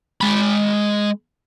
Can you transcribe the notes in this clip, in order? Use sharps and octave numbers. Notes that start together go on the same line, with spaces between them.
G#3 B5